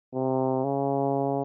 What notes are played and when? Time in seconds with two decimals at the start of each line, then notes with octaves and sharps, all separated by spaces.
0.14 C3
0.64 C#3